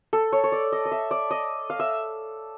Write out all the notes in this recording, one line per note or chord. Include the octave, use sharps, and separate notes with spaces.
A4
C#5
C#5
D5
D#5
D#5
E5
D5
D#5
F5
E5